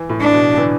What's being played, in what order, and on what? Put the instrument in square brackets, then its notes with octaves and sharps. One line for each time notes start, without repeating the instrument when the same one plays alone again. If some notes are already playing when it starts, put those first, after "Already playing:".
Already playing: [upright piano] E3
A2
[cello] D4
[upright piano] B2
D3
E3